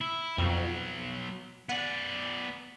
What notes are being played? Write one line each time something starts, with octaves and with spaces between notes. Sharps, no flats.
E4
F2 B2 F#3
B3 D5 F#5